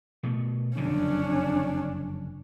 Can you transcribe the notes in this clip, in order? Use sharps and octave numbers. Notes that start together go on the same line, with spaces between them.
B2 A3
F#1 F2 D3 C#4 D4